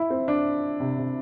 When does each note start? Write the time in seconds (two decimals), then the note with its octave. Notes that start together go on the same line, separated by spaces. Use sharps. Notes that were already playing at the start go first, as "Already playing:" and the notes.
Already playing: E4
0.10 C4
0.28 D4
0.80 C3
0.98 C3